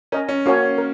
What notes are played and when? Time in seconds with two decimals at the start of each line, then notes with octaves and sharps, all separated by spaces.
0.12 C#4 A#4 D#5 G#5
0.29 C#4
0.46 A#3 C#4 F#4 C#5 G#5
0.78 A#4